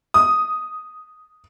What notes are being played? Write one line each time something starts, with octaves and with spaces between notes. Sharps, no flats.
D#6